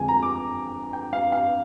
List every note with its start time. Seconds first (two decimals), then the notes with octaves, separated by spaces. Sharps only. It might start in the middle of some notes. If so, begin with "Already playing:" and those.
Already playing: F2 D3 G#3 G#5
0.08 A#5
0.23 D6
0.93 G5
1.13 F5
1.32 F5